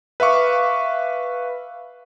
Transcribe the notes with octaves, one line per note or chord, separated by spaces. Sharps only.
B4 E5 F5 C#6 D6